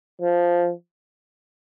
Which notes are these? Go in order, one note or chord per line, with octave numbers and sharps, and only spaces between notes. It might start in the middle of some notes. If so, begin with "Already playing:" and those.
F3